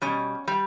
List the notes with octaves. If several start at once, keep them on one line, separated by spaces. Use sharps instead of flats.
B2 G3 C#4
G3